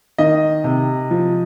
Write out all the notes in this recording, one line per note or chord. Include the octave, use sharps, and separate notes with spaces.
D#3 D#5
C3
F3